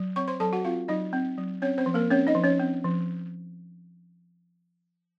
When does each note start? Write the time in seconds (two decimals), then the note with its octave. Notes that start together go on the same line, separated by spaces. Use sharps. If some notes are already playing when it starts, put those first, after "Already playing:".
Already playing: F#3
0.16 C4 C#5 C#6
0.28 C5 C6
0.40 F#3 A4 A5
0.53 F#4 F#5
0.65 C4 F4 F5
0.88 F#3 D#4 D#5
1.13 C4
1.38 F#3
1.62 C4 C#4 C#5
1.78 C4 C5
1.86 F3
1.94 A#3 A#4
2.10 C4 C#4 C#5
2.27 D#4 D#5
2.35 F3
2.44 C#4 C#5
2.60 C4
2.84 F3